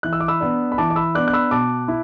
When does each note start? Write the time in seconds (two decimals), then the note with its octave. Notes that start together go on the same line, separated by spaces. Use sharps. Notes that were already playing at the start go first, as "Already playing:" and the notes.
0.03 E3 F#6
0.13 E6
0.20 D6
0.28 B5 E6
0.40 B3 D4
0.72 B5
0.78 E3 A5 D6
0.90 D6
0.96 B5 E6
1.15 B3 D4 D6 F#6
1.28 F#6
1.33 B5 E6
1.51 B2 A5 D6
1.88 E4